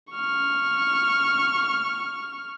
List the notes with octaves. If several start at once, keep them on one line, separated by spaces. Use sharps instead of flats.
C#6 F6